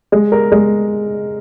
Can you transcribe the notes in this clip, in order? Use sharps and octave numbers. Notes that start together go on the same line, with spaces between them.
G#3
A#4
G#3